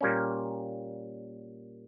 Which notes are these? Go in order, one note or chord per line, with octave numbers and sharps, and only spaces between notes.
A#2 G3 A#3 C#4